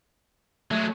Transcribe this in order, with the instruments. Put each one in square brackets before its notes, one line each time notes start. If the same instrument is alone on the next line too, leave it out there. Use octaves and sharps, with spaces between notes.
[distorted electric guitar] F#3 G#3 [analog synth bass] A3